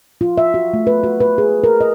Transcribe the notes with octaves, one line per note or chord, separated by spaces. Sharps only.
F4
E5
F#4
A3
B4
F#4
B4
G#4
A#4
D#5